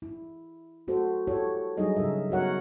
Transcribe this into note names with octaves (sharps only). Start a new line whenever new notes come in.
E4
A3 F#4 A4 C5
E4 F#4 G4 A4 C#5
F#3 G3 D4 D#4 G#4 D#5
C#3 C#4 D#4 A#4 E5
F#3 B3 F#4 A#4 C#5 F#5